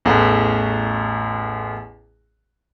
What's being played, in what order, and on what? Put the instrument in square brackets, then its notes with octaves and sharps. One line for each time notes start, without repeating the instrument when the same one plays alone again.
[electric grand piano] A1 E2 A3 F#5